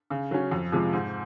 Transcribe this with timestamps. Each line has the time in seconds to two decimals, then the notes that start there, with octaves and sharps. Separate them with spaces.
0.10 C#3
0.31 F#3 C#4
0.51 F2
0.72 C3 F3 G#3
0.93 G#2